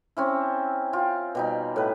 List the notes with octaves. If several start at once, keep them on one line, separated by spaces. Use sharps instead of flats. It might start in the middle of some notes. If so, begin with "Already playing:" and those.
C4 C#4 E4
F4 G4
B2 G3 D#4
A2 B4